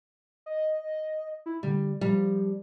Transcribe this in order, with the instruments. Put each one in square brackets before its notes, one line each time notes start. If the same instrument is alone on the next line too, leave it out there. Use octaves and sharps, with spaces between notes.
[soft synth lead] D#5
E4
[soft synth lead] D3 [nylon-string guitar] G3
[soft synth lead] F3 [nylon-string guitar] G3